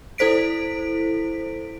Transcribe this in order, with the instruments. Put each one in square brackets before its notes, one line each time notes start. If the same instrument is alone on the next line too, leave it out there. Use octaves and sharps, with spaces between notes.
[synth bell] E4 A4 C5 B6 D7